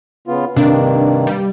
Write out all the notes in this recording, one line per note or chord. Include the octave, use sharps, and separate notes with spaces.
C#3 B3 F4
G2 C3 D#3 A#3 D4
G3